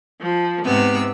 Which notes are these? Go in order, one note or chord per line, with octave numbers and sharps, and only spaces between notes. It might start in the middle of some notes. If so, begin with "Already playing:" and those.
F3
G#2 C3 B3 E6